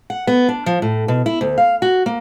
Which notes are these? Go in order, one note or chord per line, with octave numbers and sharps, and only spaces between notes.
F#5
B3
D4
F3
A2
B2
E4
D2
F5
F#4
A#3